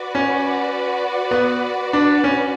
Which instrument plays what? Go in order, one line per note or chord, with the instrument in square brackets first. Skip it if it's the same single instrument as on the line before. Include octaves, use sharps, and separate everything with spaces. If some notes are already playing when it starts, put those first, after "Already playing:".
Already playing: [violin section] F#4 B4 D5
[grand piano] C#4
B3
D4
C#4